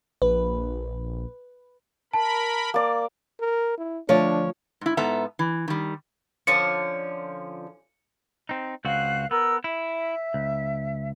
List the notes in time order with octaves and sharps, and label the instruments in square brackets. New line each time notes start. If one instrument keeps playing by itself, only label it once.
[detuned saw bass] A#1 [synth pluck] B4
[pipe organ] A#4 B5 [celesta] A5
[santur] A#3 D5
[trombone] A#4
E4
[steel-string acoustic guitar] D2 F3 C#5 [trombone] D4
[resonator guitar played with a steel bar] G#2 E4
G#2 B3 A4 E5 A#5
E3
D#3 G3
[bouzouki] D3 F3 C#4 [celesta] C#7
[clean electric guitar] C4 D#4
[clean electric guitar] C#2 C4 F#4 [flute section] F5 F#6
[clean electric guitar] B3 [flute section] A#4 E6
[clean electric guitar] E4 [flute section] E5
[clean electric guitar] C#2